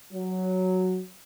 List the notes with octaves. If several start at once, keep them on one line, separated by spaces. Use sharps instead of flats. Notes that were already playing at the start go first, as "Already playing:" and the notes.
F#3